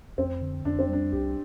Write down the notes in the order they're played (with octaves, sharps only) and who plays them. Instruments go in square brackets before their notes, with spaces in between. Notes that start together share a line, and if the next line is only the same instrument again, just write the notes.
[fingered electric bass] F2 [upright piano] C4
[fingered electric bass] D3
[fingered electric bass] F2 [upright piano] D4
[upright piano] C4
[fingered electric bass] G3 [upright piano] D4
[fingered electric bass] C2 [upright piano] G4